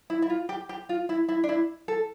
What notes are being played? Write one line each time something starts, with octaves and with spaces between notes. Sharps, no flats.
E4
E4
F4
G4
G4
F4
E4
E4
D4
E4
A4